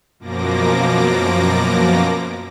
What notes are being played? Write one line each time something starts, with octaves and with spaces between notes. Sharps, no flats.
F#2 B2 F3 A#3 D6 A#6